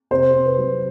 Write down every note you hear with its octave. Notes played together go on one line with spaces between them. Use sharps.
C3 C5
C3
B4
F#3